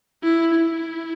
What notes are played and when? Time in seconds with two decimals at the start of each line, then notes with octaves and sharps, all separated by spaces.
0.23 E4
0.55 E4